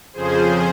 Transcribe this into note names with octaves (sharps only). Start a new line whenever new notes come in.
F2 C#3 F3 G#4 C5